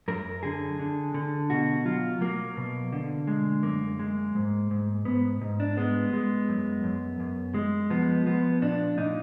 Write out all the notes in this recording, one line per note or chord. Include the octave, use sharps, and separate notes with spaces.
F#2 A#4
D3 G#4
D3
D3
B2 F#4
F#3 F4
F#3 A#3
B2
D3
G#3
F#2 A#3
G#3
G#2
G#2
G#2 B3
G#2
D4
G#3 B3
G#3
F#2
F#2
F#2
G#3
F3 B3
F3 B3
A#2 D4
A#2 D#4